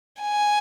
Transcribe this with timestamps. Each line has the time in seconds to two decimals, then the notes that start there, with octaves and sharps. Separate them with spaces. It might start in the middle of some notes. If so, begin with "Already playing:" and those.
0.21 G#5